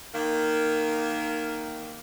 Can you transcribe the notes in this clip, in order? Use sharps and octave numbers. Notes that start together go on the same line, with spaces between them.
D#3 A#3